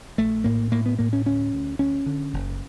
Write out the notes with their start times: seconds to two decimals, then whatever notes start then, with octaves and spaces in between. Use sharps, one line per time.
0.18 A#1 A3
0.44 A2 A#3
0.71 A2 A#3
0.86 B3
0.99 A2 A#3
1.13 C#4
1.26 D2 C#4
1.53 D2
1.79 D2 C#4
2.06 D3
2.33 F#1